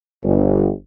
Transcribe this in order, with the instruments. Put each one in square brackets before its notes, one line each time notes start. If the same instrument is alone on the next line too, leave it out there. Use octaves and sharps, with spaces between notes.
[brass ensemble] G1